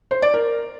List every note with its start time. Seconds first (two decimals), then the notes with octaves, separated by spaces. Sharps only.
0.11 C5
0.22 D5
0.34 A#4